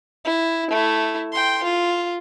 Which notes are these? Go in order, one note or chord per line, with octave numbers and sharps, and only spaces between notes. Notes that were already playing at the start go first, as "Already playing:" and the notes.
E4
A3 E4
G5 C6
F4